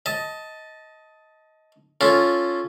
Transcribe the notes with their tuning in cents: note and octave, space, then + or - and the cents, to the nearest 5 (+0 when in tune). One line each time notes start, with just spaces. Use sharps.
D#5 +20 A5 +0
C#4 +5 F4 +0 A4 +0